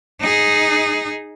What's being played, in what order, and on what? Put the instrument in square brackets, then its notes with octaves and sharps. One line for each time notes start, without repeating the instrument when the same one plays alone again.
[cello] D#4 G#4